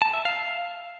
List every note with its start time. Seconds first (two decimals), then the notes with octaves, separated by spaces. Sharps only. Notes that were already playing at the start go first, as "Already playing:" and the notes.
0.02 A5
0.13 E5
0.25 F5